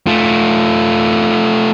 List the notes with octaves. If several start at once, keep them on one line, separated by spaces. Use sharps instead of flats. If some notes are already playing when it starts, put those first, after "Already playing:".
A3 F4